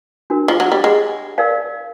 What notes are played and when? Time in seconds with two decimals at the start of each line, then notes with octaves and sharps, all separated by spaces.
0.30 D4 F#4 A#4
0.48 F3
0.60 F#3
0.72 G3
0.84 G#3
1.38 A#4 D5 F5